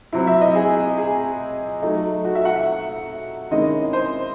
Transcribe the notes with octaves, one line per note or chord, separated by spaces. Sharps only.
C3 F#3 C4 E4
E5
D#5
G#4
G#4
F#3 A3 D#4
F#4
E5
F#5
E5
C3 D#3 G#3 C#4 E4 D#5
C5